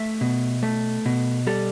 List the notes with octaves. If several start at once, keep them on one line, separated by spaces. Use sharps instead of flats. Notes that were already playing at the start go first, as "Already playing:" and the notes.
Already playing: A3 E5
B2
A3
B2
G3 A4